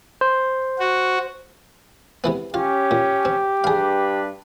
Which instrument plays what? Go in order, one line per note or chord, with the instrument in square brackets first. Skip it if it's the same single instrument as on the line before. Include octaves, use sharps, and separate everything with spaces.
[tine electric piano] C5
[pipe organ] F#4
[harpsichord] C3 E3 B3
[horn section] C#4 [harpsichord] F4 [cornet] G4
[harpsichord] A#2
C4
[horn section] G2 D4 B4 [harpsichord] G#4 F5